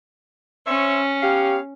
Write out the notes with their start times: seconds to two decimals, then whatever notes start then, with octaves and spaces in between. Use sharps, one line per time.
0.67 C#4 C5 C#5 E5
1.23 B3 G4 C#5 F5